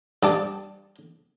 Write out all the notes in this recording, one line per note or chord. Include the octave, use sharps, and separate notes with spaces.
G2 A5 D6